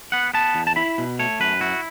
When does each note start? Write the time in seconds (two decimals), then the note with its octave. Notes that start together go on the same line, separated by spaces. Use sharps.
0.12 B3 F#5
0.34 B3 A5
0.55 E2
0.67 A5
0.76 E4 B5
0.98 B2
1.19 A3 C#5
1.40 F#2 B4
1.61 E4 F#4